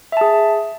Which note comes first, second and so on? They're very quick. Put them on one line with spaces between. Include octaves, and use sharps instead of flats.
E5 A5 G#4